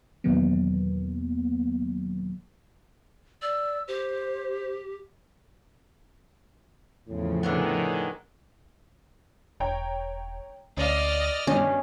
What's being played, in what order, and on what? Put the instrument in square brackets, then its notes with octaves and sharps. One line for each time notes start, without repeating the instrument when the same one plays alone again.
[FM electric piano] E2 B2 D#3 F#3 A#3 B3
[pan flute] D5 [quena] E6
[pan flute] G4 [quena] C5
[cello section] E2 C#3 F3 [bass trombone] A2
[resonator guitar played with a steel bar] D3 A#3 B3 [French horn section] D#3 G#4
[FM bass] E1 [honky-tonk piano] C#5 G5 A#5
[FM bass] D2 [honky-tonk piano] C#4 F5 [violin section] D5 D#5 F6
[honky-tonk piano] G2 B2 D4 [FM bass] D#3 [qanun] C#4